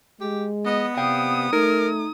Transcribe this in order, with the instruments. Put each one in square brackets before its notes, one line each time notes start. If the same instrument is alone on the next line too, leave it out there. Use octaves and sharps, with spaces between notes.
[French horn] G#3 [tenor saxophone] G4
[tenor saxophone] B3 [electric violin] D#5
[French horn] C3 [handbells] D5 F5 G5 [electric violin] D#6
[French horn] A3 [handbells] D#4 [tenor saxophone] A#4